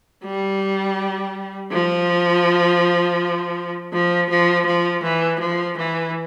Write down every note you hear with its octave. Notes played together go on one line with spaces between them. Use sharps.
G3
F3
F3
F3
F3
E3
F3
E3